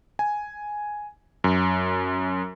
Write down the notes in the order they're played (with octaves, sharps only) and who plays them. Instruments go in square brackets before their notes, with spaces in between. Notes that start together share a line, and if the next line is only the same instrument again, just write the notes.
[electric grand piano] G#5
F#2